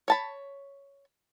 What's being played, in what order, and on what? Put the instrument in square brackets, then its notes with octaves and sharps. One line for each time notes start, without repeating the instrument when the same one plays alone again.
[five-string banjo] C#5 A5 B5